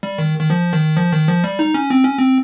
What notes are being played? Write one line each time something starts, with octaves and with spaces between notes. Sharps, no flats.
G3
D#3
D#3
F3
D#3
F3
D#3
F3
G3
D#4
C#4
C4
C#4
C4